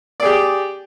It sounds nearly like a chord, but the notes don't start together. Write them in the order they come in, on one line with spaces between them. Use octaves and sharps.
D5 G#4 G4